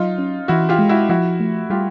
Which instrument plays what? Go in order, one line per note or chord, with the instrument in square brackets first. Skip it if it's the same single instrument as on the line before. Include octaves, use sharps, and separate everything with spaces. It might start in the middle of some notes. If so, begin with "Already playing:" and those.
Already playing: [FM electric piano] F#3 [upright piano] D#4 F4
[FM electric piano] C#4
[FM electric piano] E3 [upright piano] E4 F#4
[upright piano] F4 G4
[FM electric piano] G#3
[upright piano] E4 F#4
[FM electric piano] F3 [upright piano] E4 F#4
[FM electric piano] A3
[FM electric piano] G3 [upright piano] F4 G4